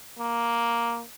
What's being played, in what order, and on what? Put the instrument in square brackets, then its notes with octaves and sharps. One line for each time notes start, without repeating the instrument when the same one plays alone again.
[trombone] A#3